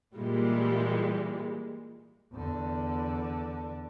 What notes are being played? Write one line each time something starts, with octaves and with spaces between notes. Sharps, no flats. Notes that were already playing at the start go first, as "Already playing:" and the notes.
A#2 E3 G3 G#3
E2 D3